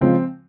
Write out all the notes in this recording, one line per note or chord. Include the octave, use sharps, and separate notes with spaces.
C#3 F3 G#3 C4